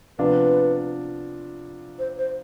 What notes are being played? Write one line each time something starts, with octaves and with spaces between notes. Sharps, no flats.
C3 F3 B3 D4 F4 B4
C5
C5